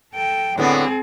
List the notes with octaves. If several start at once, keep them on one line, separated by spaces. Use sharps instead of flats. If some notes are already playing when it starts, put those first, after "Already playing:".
A4 G5
A2 D3 B3 C4 G#4